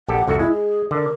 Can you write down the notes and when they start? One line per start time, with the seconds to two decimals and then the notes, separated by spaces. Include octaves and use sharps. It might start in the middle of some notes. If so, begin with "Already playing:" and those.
0.08 A#1 G4 A4 F#5
0.28 C2 F2 F#4 A4
0.39 G#3 E4
0.53 G#4
0.91 D3 A#4